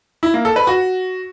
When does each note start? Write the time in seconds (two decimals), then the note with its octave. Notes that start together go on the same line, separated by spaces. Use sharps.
0.23 E4
0.34 A#3
0.45 A4
0.56 B4
0.67 F#4